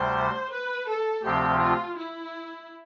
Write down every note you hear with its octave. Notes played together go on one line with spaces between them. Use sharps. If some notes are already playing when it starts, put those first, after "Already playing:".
Already playing: D2 C3 G3 C5
B4
A4
D2 C3 F3 C4 G4
F4
E4